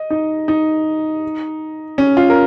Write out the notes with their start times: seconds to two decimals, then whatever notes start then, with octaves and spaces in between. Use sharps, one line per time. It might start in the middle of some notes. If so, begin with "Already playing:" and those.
Already playing: D#5
0.10 D#4
0.48 D#4
1.98 C#4
2.17 F4
2.30 A#4